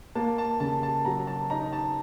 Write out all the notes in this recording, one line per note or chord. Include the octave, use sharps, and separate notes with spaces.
A#3 A5
A5
C#3 A5
A5
F#3 A#5
A5
D#4 A#5
A5